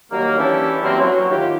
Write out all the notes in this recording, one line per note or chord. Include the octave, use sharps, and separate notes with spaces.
D#3 F#3 G3 A#3
E3 C#4 D4 E4 G4 A5
E3 F#3 G3 A#3 C4
F#3
A2 D#3 F4 G4